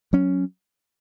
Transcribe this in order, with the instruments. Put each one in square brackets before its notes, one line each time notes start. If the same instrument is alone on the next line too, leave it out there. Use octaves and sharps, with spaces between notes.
[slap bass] F#3 C#4